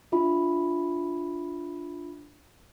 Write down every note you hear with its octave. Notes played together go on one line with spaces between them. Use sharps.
D4 F4 E5 B5